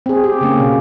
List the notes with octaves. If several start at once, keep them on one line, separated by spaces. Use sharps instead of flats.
C4 G#4
G4
C#3 A#3 C#4
B2